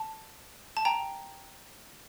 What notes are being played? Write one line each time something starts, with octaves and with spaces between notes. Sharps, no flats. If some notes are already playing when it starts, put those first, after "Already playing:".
Already playing: A5
A5
G5 A#5